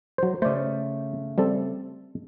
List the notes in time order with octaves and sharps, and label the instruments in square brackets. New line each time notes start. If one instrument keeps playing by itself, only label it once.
[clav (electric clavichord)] F#3 C5
[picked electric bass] C#3 A3 [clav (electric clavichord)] C5 D5
[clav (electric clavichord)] G3 C4 A4